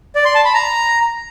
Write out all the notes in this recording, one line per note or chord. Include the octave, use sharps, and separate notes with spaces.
D5
C6
A5
B5
A#5